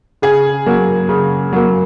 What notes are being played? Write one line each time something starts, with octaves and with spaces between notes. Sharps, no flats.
C#3 G#4
F#3 A#3
C#3
F#3 A#3